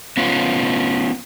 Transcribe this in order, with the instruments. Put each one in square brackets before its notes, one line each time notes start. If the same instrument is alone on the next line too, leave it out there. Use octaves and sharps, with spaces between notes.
[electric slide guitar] B3 C#4 F4